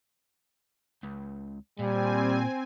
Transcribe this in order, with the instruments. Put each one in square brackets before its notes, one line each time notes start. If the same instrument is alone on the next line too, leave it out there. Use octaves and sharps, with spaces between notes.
[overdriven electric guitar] C#2
[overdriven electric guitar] A#2 [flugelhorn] G3 [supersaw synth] C4 G#5